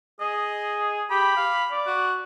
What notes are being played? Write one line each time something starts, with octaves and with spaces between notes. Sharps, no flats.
G#4 D#5
G4 B5
F5
D5
F#4